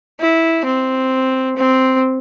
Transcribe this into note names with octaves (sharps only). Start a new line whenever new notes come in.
E4
C4
C4